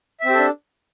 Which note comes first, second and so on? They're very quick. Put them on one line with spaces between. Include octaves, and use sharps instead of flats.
E5 C4 G4 A4 D4